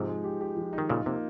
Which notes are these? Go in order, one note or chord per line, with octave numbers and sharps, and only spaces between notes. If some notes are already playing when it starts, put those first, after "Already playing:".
Already playing: G#2 C3 F3 D#4
G#3
G4
G4
F3
D#4
D#3
A#2 C#3 F4
C3 A#3